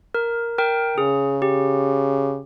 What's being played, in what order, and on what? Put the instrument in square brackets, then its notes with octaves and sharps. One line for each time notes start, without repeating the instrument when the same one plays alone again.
[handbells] A#4
A#4 G5
[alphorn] C#3 [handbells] G#4
[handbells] G4